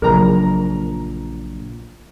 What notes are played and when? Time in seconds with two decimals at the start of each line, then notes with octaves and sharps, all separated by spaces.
0.02 A#1 C#3 F#3 A#4 A#5